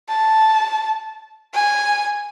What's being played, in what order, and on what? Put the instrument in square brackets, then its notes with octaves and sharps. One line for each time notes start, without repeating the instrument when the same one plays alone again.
[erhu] A5
G#5